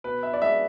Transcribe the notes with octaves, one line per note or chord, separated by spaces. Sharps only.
B2 B4
E5
D5
G#3 E5